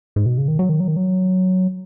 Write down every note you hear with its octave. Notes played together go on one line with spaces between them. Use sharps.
G#2
B2
C#3
D#3
F#3
D#3
F#3
D#3
F#3